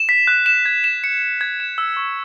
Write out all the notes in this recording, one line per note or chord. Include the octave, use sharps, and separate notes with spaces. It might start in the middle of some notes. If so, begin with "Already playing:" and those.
Already playing: E7
B6
F#6
E7
G#6
E7
C#7
C#7
G#6
E7
E6
C#6